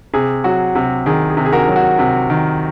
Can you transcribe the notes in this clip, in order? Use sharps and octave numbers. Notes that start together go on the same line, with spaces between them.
C3 G#4
F#3 F#4
C3 F#4
D#3 G#4
G#4
C3
G#4
F#4 A#4
F#3
F#4
C3
D#3